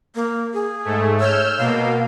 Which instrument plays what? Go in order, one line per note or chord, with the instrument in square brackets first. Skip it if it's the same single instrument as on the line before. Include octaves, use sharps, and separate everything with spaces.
[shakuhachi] A#3
G#4
[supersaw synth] G#2 A3
[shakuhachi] C#5 [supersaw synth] E6 F6 G6
[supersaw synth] B2 A#3 [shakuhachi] F5